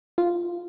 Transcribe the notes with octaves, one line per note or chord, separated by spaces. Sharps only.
F4